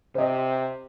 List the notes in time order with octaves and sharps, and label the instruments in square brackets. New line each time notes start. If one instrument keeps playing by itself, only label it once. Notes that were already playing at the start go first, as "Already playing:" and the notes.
[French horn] C3 [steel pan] C5 D#5